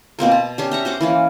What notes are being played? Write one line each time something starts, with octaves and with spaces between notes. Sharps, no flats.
B2 A#3 C4 A#4
A5
C#4 D4 G4
E5 A#5 C#6
F#4 C5 F#5 D6
E3 A#3 C#4